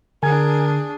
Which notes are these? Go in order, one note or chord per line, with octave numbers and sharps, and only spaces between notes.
D3 D4 G#4 A#4 G#5 G#6